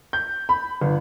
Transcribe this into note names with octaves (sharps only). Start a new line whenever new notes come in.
G6
B5
G1